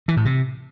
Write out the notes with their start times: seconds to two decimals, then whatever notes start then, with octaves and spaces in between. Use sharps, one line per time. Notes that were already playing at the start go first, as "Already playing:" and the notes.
0.08 E3
0.17 A2
0.25 C3